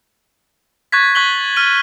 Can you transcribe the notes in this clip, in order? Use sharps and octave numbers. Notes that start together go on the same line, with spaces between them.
C#6 F#6 G#6 A6 B6
C#6 F#6 B6 F#7 G7
F6 D#7